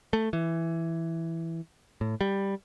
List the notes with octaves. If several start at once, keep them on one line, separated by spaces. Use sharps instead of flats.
A3
E3
A2
G3